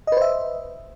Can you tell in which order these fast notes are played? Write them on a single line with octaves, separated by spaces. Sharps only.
D#5 B4 C5 E5